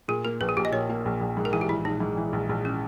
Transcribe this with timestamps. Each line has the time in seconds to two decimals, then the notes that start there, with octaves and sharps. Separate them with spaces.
0.08 A#2 G#4
0.25 A#3 A#4
0.41 A#1 B4
0.49 G#4
0.57 A#1 G4
0.65 D#5
0.72 A#2 C#5
0.89 A#3
1.06 A#1
1.21 A#1
1.37 G#2
1.45 A#4
1.52 E3 G#4
1.61 G4
1.69 A#1 E4
1.85 A#1 D#4
2.00 G#2
2.17 E3
2.33 A#1
2.49 A#1
2.65 C#4